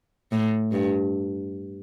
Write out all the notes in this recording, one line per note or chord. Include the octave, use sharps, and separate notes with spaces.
A2
G2